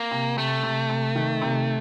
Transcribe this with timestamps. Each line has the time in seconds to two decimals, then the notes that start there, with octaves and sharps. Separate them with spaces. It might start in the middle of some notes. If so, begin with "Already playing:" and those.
Already playing: A#3
0.11 C3
0.37 C3 A3
0.63 C3
0.89 C3
1.15 D#3
1.42 C3